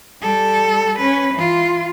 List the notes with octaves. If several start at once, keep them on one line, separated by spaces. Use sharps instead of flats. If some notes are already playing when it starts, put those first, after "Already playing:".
G3 A4
C#4 B4
E3 F4